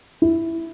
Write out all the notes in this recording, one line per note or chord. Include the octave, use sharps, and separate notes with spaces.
E4